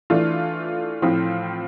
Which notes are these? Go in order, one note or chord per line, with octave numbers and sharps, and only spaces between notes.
E3 A3 D4 F4
A2 F3 C4 F4